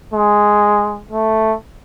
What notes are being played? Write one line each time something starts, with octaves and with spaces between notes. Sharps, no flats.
G#3
A3